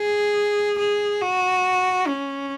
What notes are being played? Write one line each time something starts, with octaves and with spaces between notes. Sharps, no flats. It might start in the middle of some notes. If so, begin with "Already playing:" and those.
Already playing: G#4
G#4
F#4
C#4